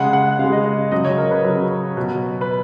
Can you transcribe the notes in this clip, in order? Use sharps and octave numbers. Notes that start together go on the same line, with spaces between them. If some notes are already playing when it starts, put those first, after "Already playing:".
Already playing: C#3 G#3 F#5
F#5
C#3 G#3 F5
D#5
D#5
C#3 F#3 D#5
C#5
A#4
B4
C#3 F#3
B2 F#3
B4